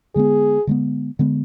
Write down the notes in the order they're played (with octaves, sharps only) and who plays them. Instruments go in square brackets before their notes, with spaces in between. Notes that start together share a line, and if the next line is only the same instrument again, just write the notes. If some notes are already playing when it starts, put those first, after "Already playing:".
[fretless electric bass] D3 G#3 B3 [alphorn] G#4
[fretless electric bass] D3 G#3 B3
D3 G#3 B3